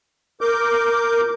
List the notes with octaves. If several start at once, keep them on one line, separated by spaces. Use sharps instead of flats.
A#4 D6 G6